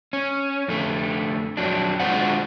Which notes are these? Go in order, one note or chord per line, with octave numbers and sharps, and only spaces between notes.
C#4
F2 D3 A3
F2 F#3 D4
G#3 D4 F4 F#4 C5 F#5